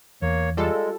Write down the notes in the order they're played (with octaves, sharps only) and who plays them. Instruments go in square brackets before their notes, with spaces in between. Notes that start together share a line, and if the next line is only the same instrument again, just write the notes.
[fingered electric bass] E2 [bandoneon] A#3 C#5
[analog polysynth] G3 F4 A4 [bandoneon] G#3